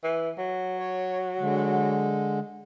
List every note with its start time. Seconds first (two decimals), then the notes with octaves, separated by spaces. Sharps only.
0.04 E3
0.38 F#3
0.79 C#5
1.40 D3 G#3